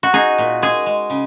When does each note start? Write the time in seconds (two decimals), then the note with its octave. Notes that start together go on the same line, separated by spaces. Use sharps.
0.03 F#4
0.13 D#4 G#4
0.38 A#2
0.62 G#3 G#4
0.86 G#3
1.10 C#3